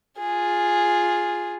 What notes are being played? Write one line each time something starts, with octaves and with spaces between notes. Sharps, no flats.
F4 G#4